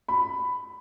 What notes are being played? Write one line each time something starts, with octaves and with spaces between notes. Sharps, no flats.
B5